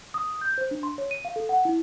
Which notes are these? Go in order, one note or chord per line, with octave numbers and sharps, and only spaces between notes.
D#6
G6
C5
D4
C6
C#5
D#7
F5
A4
F#5
E4